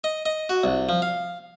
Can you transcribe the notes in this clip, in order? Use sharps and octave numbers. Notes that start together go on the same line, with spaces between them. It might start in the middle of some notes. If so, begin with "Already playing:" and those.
D#5
D#5
F#4
C2
F3
F5